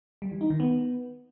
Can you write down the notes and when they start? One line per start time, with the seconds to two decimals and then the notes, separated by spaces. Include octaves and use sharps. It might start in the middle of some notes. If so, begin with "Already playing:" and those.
0.22 G3
0.31 E3
0.41 D#4
0.50 D#3
0.60 B3